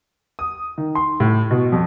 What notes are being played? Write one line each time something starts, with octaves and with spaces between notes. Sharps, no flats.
D#6
D#3
C6
A2
B2
F2